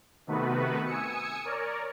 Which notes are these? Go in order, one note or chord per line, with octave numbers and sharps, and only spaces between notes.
C3 D#3 A3 B3 F#4 B4
G#5 D#6 E6 C#7
A#4 C#5 D5